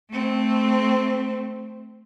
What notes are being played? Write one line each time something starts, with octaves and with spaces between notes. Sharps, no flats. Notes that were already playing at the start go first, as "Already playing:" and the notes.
A3 C4